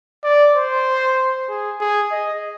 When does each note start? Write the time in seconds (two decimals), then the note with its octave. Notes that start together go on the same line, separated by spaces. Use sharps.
0.24 D5
0.56 C5
1.49 G#4
1.80 G#4
2.11 D#5